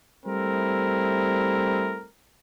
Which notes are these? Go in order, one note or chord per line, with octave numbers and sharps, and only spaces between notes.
G3 A3 C4 E4 A#4